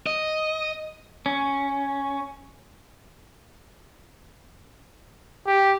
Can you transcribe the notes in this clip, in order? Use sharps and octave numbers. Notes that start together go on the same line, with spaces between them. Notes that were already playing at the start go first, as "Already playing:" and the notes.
D#5
C#4
G4